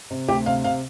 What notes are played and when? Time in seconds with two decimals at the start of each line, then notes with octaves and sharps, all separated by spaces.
0.10 C3
0.28 D2 G4
0.46 C3 F5
0.64 C3 F5